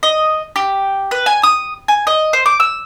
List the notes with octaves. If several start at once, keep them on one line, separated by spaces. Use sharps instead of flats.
D#5
G4
B4
G#5
D#6
G#5
D#5
C5
D6
E6